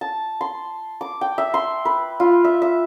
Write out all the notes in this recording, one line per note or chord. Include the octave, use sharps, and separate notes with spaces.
A5
C6
D6
G5
E5
C6
B4
F4
E5
E5